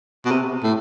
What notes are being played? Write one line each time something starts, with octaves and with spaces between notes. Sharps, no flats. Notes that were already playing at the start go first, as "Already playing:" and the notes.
B2
C3
A2